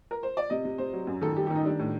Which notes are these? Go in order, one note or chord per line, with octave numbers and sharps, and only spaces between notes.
A#4
C5
D5
C3 D#5
C3
C3 C5
F#3
F#2
D#3 A4
G3 G4
G4
D#3
D#4
G3 D4
A2